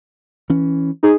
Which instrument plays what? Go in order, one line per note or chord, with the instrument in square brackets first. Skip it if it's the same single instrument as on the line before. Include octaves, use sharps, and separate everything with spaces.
[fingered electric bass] E3 C#4
[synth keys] D#4 G#4